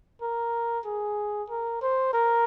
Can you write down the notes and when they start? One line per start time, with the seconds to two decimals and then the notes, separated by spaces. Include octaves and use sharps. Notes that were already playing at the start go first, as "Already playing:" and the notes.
0.22 A#4
0.86 G#4
1.49 A#4
1.82 C5
2.14 A#4